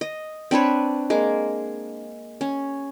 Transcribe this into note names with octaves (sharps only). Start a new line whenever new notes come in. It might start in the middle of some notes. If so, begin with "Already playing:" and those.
D#5
C4 D4 B4 C#5
G#3 A#3
C#4